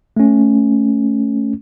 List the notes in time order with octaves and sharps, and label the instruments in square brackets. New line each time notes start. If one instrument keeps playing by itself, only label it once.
[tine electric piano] A3 C#4